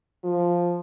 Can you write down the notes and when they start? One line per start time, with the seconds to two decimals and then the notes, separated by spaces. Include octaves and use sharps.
0.24 F3